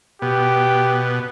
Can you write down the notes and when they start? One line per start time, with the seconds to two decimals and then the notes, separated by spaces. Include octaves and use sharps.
0.22 B2 G4